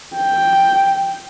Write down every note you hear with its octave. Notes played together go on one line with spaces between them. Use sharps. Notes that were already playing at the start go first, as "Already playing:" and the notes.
G5